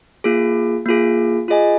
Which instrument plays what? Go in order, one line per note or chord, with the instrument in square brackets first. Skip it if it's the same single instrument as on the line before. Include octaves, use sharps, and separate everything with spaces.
[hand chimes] A#3 F4 G#4
A#3 F4 G#4
F4 G#4 D#5 G#5